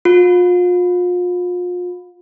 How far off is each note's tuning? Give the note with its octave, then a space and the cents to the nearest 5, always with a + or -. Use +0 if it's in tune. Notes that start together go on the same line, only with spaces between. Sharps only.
F4 +35